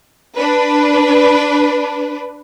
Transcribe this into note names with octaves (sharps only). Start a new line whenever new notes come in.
D4 B4